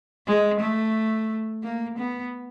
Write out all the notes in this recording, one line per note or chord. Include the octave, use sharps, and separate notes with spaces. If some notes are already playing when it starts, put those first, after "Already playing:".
G#3
A3
A#3
B3